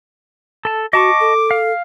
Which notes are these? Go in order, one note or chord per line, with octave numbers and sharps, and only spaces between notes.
A4 A5
F#4 D#5 A5 C#6 D6
A4
F5